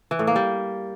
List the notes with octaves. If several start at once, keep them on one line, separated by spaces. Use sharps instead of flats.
E3
A2
A#3
G3